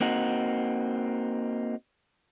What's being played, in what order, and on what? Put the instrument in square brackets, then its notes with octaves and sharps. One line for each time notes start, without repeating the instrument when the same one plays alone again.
[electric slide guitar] A#3 C4 D#4 F#4